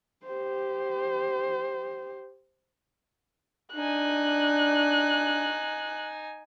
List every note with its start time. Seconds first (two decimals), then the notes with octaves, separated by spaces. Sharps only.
0.25 G4 C5
3.76 D4 D#4 G#5 F#6